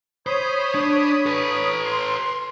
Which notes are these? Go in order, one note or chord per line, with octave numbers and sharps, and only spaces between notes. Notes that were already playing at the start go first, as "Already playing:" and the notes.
C5 C#5 B5 D#6
D4
A4 B4
C6